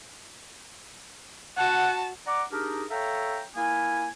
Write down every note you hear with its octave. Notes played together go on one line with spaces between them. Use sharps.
F#4 F#5 A5
D5 F#5 A#5 D6
D4 D#4 G4 G#4 A#4
A4 C#5 E5 F5 G5 A#5
A#3 E4 A#4 G#5